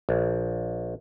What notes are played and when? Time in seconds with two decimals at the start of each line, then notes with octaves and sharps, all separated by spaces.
0.09 A#1